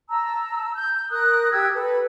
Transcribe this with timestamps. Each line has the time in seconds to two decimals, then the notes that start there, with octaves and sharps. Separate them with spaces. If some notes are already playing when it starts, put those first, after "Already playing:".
0.10 A5 A#5 E6
0.75 G6
1.11 A#4 D#6 F#6
1.52 G4 G5 E6 G#6
1.74 A4 B4